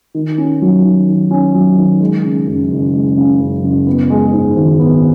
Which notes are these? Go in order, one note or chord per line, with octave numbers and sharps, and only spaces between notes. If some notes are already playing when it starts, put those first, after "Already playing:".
D#3
C#4
F#3
D#3
D#3
C#4
F#3
D#3
G#3
C#3
F#2
F#1
G#3
C#3
F#2
F#1
B3
G#3
G#2
G#1
B3